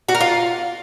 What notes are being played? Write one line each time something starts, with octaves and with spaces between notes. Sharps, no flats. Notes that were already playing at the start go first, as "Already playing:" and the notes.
F#4
A#4
F4